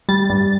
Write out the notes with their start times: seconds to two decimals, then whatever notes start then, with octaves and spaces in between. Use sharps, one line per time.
0.09 G3 A6
0.30 G2